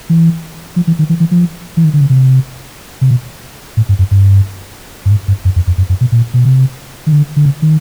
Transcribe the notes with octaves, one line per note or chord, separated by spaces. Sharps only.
E3
F3
E3
D#3
E3
E3
F3
E3
D#3
D3
C#3
C3
C3
B2
A2
G2
F#2
G2
G2
G#2
G2
F#2
F2
F2
F#2
F#2
B2
A#2
B2
C3
D#3
D3
D3
C#3
D#3